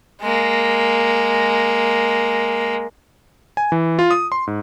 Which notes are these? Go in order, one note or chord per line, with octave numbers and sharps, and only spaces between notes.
G#3 A#3
G#5
E3
F4
D#6
C6
G#2